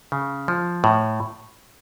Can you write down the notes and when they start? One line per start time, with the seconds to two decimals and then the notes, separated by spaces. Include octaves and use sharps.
0.12 C#3
0.48 F3
0.84 A2